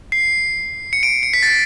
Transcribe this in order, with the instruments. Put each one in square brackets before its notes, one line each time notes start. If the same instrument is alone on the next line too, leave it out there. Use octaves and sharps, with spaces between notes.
[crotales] C7
C#7
D7
C#7
B6
A6